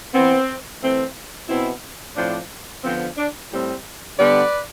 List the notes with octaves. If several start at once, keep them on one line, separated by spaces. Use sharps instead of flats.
E3 B3 C4
E3 A3 C4
B2 B3 C4 E4
A2 F3 C4 D4
D3 F3 B3 C4
D4
A2 G3 C4
D3 G3 B3 B4 D5